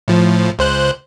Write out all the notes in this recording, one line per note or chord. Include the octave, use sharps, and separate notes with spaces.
A2 F3
C#2 C5 F#6